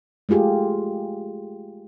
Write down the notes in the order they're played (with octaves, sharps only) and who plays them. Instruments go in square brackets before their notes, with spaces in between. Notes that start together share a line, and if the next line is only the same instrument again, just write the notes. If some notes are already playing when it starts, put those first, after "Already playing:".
[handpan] G#3 A3 F4 G4 G#4